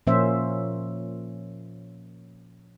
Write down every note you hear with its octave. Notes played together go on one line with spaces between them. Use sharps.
A#2 F3 A#3 C#4 C5 E5